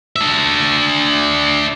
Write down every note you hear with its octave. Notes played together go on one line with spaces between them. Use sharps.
D4 E5